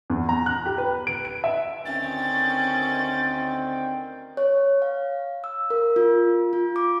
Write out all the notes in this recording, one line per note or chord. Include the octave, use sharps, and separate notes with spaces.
E2
A#5
F#6
G4
B4
D7
D7
E5
D2 D#3 C4 C#4 G5 A6
C#5
F5
E6
A#4
F4
F4
D6